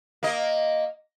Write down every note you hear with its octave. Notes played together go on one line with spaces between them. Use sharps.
A#3 D#5